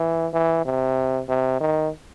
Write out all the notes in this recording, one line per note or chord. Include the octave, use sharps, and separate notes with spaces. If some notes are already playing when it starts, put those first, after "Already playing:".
Already playing: E3
E3
C3
C3
D#3